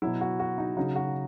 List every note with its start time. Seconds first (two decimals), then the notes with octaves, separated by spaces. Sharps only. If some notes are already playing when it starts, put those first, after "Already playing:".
0.02 B2 F#3 E4
0.21 F#4
0.39 F#4
0.58 D#4
0.77 C#3 F#3 D#4
0.96 F#4